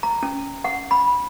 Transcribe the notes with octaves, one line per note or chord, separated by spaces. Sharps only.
A#5
C#4
F#5
B5